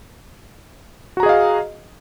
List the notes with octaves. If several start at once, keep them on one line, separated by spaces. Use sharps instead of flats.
F#4 G#4 D#5 F5 A#5